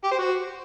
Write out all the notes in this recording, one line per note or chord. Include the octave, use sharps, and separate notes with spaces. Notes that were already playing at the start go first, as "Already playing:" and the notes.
G4
C5
F#4